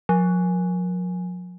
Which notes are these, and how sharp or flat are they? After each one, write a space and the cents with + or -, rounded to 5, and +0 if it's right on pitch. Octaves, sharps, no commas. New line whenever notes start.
F3 +45